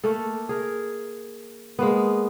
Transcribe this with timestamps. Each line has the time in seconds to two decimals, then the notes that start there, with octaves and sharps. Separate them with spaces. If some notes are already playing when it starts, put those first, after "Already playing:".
0.04 A3 A#3 A4
0.49 G#4 A#4
1.79 G#3 A#3 B3